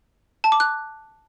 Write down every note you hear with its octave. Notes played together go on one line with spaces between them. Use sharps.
A5
D6
F#6